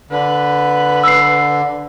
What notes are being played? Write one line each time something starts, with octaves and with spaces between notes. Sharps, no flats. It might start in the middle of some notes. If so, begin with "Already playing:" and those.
D3 B4
E6 C7